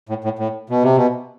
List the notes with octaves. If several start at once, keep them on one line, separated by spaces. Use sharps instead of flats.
A2
A2
A2
B2
C3
B2